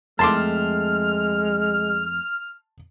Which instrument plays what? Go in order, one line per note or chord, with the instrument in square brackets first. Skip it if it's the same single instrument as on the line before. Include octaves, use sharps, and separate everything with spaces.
[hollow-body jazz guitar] F2 A3 [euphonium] G#3 [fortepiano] A5 C6 D6 [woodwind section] F6